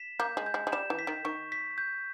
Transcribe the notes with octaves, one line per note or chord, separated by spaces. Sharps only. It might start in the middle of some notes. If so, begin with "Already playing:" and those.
Already playing: B6 E7
A#3 G6
G#3
G6
G#3
G#3
G3 E7
E3
B6
D#3
D#3 C#6
B6
G6